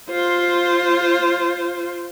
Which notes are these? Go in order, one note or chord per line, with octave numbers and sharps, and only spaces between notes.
F4 C5